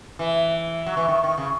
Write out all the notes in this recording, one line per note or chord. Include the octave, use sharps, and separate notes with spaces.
E3
F#3
E3
D#3
D#3
C#3